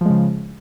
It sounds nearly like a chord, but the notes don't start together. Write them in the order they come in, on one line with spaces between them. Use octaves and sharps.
F3 G#3 C#3